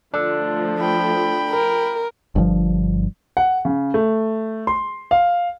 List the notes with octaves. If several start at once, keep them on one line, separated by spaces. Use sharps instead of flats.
F3 A3 D4 A4
G5 B5
A#4
G1 G2 C3 F3
F#5
C#3
A3
C6
F5